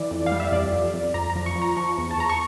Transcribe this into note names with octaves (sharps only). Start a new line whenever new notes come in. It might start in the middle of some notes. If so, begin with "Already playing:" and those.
Already playing: E3 D5
F2
F5
G3
E5
F2 D5
F2
F2
F2 A#5
A#5
F3
C#6
F3
A#5
F3 C#6
E2
A5
E2 A#5
C#6